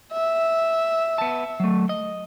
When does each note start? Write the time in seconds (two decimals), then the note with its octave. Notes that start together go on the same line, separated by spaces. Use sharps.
0.12 E5
1.18 B3 A5
1.60 F#3 A3
1.89 D#5